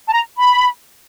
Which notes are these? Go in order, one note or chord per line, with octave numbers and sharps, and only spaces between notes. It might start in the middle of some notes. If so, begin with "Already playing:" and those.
A5
A#5
B5